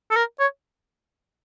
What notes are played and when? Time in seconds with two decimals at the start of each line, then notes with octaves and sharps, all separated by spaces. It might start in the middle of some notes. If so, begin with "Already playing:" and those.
0.11 A4
0.16 A#4
0.40 C#5